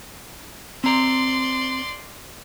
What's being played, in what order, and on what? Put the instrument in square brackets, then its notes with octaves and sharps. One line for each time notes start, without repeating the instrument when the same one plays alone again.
[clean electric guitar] C4 A#5 [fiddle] D5 C6